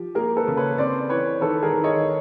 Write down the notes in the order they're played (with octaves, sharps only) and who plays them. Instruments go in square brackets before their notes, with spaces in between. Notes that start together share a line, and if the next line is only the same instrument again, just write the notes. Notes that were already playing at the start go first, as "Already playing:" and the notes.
Already playing: [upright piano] F3 [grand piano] G4
[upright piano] A#3 [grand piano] G#4 A#4
[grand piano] A4 B4
[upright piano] C#3
[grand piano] B4 C#5
[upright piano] C4 [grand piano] C5 D5
[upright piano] E3 [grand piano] B4 C#5
[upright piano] D#3 [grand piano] A4 B4
[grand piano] G#4 A#4
[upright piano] D#3
[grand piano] C#5 D#5